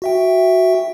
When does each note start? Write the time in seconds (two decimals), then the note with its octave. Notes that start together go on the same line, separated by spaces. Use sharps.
0.02 F#4 E5 G5